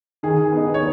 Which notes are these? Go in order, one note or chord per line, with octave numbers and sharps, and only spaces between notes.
D#3 G#4
B3 D#4
C#5